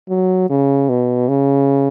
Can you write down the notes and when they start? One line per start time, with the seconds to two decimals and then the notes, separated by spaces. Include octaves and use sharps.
0.09 F#3
0.50 C#3
0.89 B2
1.29 C#3